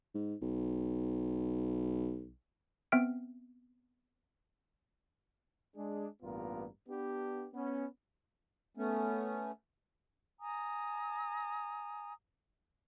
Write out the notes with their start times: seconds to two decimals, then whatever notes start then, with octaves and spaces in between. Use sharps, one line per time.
0.15 G#2
0.42 B1
2.92 B3 C4 E5 F6 D7
5.76 G#3 D4 G#4
6.23 A1 G2 A#3 B3 F4 A#4
6.88 B3 D4 G4
7.54 B3 C#4
8.77 A3 B3 C#4
10.40 G#5 A#5 D#6